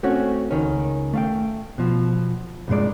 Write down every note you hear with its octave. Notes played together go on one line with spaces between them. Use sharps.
A3 C4 C#4 F#4
C#2 D#3 C#4
A3 F5 G5
B2 F3
C2 G2 A#2 G#3 D5